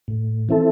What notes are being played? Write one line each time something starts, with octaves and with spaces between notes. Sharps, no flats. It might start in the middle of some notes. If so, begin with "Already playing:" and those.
A2
E3 C4 E4 A4